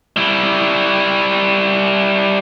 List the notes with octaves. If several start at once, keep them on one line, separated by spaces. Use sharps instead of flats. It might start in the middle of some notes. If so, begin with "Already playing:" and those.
G3 E4